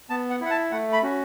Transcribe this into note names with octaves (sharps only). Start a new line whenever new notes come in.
B3 A5
F#5
E4 F#5
A5
A3 F#5
B5
C#4 F#4